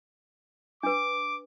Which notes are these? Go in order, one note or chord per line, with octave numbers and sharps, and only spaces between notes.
D4 B4 D6